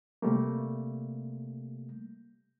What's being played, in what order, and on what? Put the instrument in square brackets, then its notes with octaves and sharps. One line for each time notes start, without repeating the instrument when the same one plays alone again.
[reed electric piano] C3 G3 A3 A#3